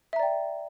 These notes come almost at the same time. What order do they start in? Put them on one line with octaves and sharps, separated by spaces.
E5 A#5 D5 G5